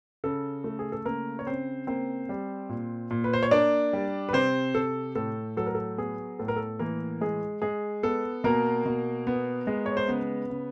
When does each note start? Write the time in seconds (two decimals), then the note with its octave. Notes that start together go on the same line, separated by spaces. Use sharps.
0.24 C#3 A4
0.64 A3
0.79 G#4
0.92 A4
1.05 C#3 A#3 A#4
1.39 C#5
1.47 C#3 C4 C5
1.87 A#3 C4 C5
2.29 G3
2.69 A#2
3.11 A#2
3.24 B4
3.34 C5
3.43 C#5
3.51 A#3 D4 D5
3.93 G3
4.29 B4
4.33 C3 C4 C5
4.75 C3 A4
5.15 A2 A4
5.57 F#3 A4
5.67 A#4
5.75 A4
5.98 B3 G#4
6.39 A2 A4
6.48 A#4
6.56 A4
6.79 E3 A#3 A#4
7.21 G#3 G#4
7.62 G#3 G#4
8.03 B3 A4
8.44 B2 A#3 A#4
8.85 B2
9.27 B3
9.67 G#3
9.86 C#5
9.97 C5
10.08 C#3 B3 B4
10.50 C#3